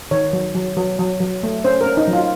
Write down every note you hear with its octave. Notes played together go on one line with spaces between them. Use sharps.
D#3 C#5
F#3
F#3
F#3
F#3
F#3
A3
C#4 C5
A#4
C#4
D#4
F#3
F4